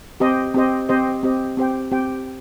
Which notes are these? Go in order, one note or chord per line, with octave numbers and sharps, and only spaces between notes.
C4 G4 C5 D#5
C4 G4 C5 D#5
C4 G4 C5 D#5
C4 G4 C5 D#5
C4 G4 C5 G5
C4 G4 C5 G5